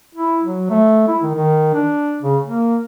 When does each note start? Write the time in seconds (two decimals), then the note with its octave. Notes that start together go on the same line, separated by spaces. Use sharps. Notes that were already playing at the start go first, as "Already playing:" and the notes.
0.15 E4
0.42 F#3
0.70 A3
1.08 E4
1.22 D#3
1.35 D#3
1.74 D4
2.22 C#3
2.46 A#3